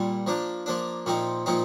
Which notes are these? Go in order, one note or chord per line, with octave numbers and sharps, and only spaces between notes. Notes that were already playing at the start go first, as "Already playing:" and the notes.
Already playing: A#2 G3
F3 A#3 D4
F3 A#3 D4
A#2 F3 C4 D#4
A#2 F3 C4 D#4